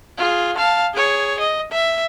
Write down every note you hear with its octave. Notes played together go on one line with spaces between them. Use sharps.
F4 G#4
F5 A5
G#4 C#5
D#5
E5